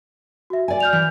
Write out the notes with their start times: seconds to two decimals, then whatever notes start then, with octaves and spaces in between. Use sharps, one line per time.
0.50 F#4 E5
0.68 D5 G#5
0.80 F6 G6 F7
0.93 E3